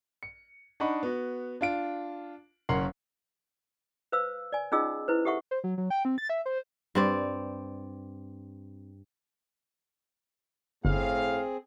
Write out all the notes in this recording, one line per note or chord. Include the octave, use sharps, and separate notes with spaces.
C#7
D4 D#4 D#5 F#5 B5 C#6
B3 F#4
D4 F4 D7
F#1 C#4 A#4 F#5 C6 C7
B4 C5 F5 E6
D5 G#5
C#4 D#4 F4 G#4 D#5 E6
E4 B4 C5
G4 A4 E5 F#5 C#6
C5
F#3
F#3
G5
C4
A6
E5
C5
G2 C4 D5
G1 A2 C4 G#4 F5